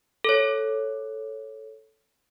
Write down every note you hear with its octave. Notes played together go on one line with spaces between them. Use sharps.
A4 C#5